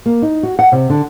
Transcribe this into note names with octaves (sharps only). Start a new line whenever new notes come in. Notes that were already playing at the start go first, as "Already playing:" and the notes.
A#3
D#4
F#4
F#5
C3
D3